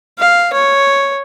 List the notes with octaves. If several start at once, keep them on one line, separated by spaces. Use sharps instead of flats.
F5
C#5